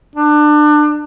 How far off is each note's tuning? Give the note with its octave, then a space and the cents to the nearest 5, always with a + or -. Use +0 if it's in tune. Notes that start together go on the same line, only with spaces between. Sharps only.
D4 +25